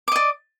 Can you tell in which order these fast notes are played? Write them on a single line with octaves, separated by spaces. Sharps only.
D6 D#5 D5